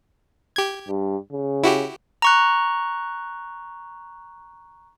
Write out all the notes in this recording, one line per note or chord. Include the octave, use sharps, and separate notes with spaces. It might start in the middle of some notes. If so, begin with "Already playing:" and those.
G4 G#6
G2
C#3
E4 F#4 G4
A#5 C#6 F#6